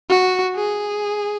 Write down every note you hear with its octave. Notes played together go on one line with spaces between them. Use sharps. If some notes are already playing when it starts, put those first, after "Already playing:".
F#4
G#4